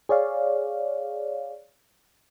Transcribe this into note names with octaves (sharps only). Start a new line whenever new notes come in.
G#4 C#5 D5 F5